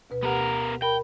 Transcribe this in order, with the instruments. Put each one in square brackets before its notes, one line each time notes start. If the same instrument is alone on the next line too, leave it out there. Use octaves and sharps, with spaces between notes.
[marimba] D2 B2 B4
[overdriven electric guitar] B3 A#4 [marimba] G4 F#5
[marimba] A#4 B5 [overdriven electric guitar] G5